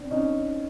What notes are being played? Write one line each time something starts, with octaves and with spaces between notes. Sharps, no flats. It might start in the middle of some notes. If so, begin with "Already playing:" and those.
Already playing: C4 D4
C#4 D#4